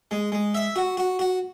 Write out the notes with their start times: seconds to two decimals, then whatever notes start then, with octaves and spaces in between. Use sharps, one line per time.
0.11 G#3
0.32 G#3
0.54 E5
0.76 F#4
0.97 F#4
1.19 F#4